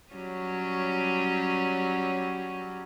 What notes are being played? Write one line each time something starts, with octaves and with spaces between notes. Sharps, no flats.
F#3 G3 C#4